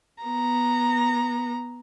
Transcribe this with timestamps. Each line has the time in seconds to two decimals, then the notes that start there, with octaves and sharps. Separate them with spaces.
0.23 B3 A#5